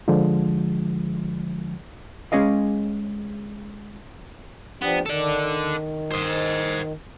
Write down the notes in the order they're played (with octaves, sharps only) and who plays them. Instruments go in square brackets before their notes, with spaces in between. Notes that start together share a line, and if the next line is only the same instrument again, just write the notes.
[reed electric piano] D3 F3 G#3
[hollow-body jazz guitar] G#3 C#4 G#4 D#5 F5
[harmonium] F3 D4 G4 [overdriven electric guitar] B3
[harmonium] D#3 [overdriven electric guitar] A4 D5
[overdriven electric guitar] C5 D#5